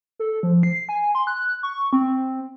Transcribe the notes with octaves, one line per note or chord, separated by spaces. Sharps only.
A4
F3
C7
G#5
C6
F#6
C#6
C4